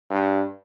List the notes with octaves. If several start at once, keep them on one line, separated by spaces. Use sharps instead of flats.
G2